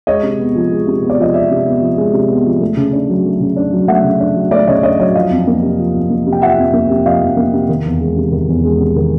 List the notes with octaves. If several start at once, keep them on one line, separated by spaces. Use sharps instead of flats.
G#3 C#5 D#5
C3
B3
F3
G#3
C3
B3
D5
F3 D#5
G#3 D5 E5
C3
B3
F3
G#3
C3
B3
F3
A3
C#3
D4
F#3
A3
C#3
D4
F#3
A3 E5 F#5
C#3
D4
F#3
A3 D5 E5
C#3 C#5 D#5
D4 C#5 D#5
F#3 C#5 D#5
F3 D#5 F5
F2
A#3
C3
F3
F2
A#3
C3
G5
F3 E5 F#5
F2
A#3
C3
F3 D#5 F5
F2
A#3
C3
D#3
E2
G#3
C3
D#3
E2
G#3
C3
D#3